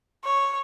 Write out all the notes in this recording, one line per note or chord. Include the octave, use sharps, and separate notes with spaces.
C#5